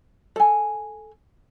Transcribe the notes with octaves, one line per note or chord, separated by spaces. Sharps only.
A4 G#5